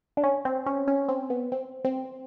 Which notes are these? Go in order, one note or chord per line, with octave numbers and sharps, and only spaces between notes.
D4
C#4
C4
C#4
C#4
C4
B3
C4
C4